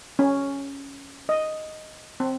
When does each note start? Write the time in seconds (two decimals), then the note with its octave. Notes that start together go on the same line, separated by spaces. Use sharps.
0.19 C#4
1.29 D#5
2.20 C4